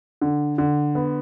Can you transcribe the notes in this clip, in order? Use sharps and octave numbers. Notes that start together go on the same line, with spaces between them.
D3
D3
B3